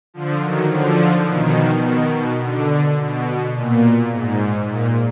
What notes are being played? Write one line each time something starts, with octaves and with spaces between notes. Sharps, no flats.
D3 F3
D#3 F#3
D3 F3
B2 D#3
B2 D#3
B2
D3
B2
A#2
G#2
A#2